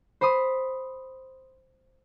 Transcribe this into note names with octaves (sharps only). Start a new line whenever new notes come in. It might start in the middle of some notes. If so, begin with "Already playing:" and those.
C5 B5 C6 D#6